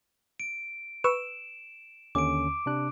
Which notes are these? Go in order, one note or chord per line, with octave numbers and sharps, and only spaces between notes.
D7
B4 C#6 E6 E7
D#2 D3 C#4 D6 D7
C3 D4 F#6